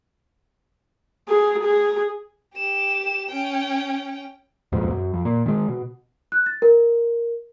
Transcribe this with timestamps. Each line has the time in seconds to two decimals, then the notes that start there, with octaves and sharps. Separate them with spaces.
1.29 G#4
1.64 G#4
2.54 G4 E7
3.30 C#4 G5
4.72 D#1 B1 F2 G#2
4.90 F#2
5.14 F2
5.25 A#2
5.46 D#3 G#3
5.68 B2
6.32 F#6
6.46 A6
6.62 A#4